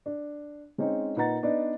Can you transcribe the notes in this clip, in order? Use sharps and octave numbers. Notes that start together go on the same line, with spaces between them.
D4
G#3 C4 C#4 D#4
A#2 D#4 B4 F#5 A#5 A6
B3 D4 D#4 D5 D#5